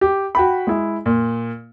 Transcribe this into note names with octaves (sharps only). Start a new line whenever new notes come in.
G4
F#4 G5 B5
G#3 E4
A#2